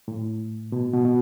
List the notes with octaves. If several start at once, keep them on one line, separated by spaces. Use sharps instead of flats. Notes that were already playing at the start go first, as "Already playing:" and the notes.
A2
B2
B2
B2